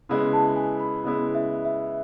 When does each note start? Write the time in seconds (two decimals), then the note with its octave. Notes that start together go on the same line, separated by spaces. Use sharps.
0.09 C#3 G#3 B3 E4 B5
0.33 A5
0.56 G#5
0.80 B5
1.04 C#3 G#3 B3 E4 B5
1.35 E5
1.65 E5